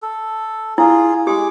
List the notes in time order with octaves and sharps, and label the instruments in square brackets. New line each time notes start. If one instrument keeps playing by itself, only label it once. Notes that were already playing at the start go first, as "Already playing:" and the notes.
[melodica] A4
[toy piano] E4 [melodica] F4 G#4
[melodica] G#3 G#4 D6 [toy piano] G4